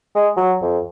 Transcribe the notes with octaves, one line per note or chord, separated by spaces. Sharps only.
G#3
F#3
F2